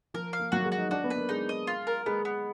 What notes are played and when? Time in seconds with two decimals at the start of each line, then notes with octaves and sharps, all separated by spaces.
0.14 F3 A#4
0.33 F5
0.40 A#3
0.52 F#3 F#4
0.59 A#3
0.65 G#3
0.72 F#4
0.78 D#4
0.91 D4 F#4
1.04 B3
1.10 B4
1.16 A#3
1.29 G#3 D#4
1.49 D#5
1.67 F4
1.87 A#4
2.06 G#3 B3
2.25 B3